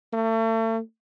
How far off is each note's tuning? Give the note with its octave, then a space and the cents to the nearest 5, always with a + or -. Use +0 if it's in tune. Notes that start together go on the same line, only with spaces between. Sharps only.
A3 +40